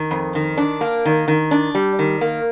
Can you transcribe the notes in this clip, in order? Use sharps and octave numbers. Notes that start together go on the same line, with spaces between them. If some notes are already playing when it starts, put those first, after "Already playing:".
Already playing: D#3
F2
D#3
D4
A#3
D#3
D#3
D4
G3
D#3
A#3